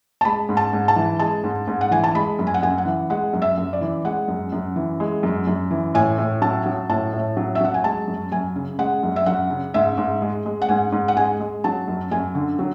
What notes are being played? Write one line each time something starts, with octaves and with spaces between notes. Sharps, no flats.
A5
G#3 B5
G#2
A5
G#2
A5
E3
G#3 A5
G#2
G#2
F#5
E3 G#5
A5
G#3 B5
F#2
G#5
F#5
F#2 G#5
F#5
E3
G#3 F#5
F#2
E5
F#2
D5
E3
G#3 F#5
F#2
F#2
E3
G#3
F#2
F#2
E3
A2 G#5
A2
F#3 A5
F#3
A2 A5
A2
F#3
E5
F#3 F#5
G#5
G#3 A5
F#2
F#2 G#5
C#3
G#3 F#5
F#2
E5
F#2 F#5
C#3
G#2 E5
G#2
G#3
G#3
F#5
G#2 G#5
G#2
F#5
G#3 G#5
G#3
F#3 A5
F#2
F#2 G#5
D3
F#3